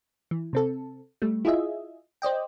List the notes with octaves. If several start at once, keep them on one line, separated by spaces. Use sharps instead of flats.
E3
C3 C4 A4
G3 A3
E4 F4 G#4 D#5 E5
C5 D5 D#5 G5